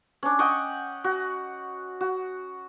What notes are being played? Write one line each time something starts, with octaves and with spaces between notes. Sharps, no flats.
C#4 D4
D#5 F#5 G5 C#6
F#4
F#4